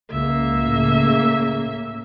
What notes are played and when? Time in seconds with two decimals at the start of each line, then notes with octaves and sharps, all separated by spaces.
0.11 C#2 A#3 E5
0.59 A2 C#3